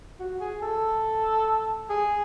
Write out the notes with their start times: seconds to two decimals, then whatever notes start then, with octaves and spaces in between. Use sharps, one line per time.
0.20 F#4
0.40 G#4
0.62 A4
1.89 G#4